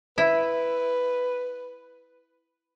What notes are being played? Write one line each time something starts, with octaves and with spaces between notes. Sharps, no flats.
E4 B4